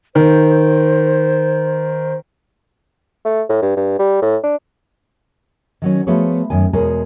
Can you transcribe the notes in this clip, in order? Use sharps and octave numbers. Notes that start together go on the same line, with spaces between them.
D#3 C5
A3
A2
G2
G2
G3
A2
D4
D#3 F#3 C#4
F3 A3 B3 F#4 G#4 C#5
F#2 D#3 G#5
E2 B2 G#3 A#4 C#5 G#5